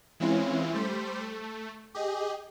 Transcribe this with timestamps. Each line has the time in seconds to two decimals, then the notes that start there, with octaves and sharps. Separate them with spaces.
0.20 E3 G#3 C4 C#4 E4 F4
0.74 G3 A3 C5 B6
1.21 A3
1.95 G4 G#4 D#5